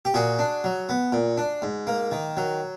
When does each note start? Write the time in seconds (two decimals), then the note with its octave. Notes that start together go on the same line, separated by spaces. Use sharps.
0.05 G4
0.14 A#2 F#4 G#4
0.39 D4
0.64 F#3
0.89 B3
1.12 A#2
1.37 D4
1.62 G#2
1.87 A#3
2.11 D#3
2.37 F#3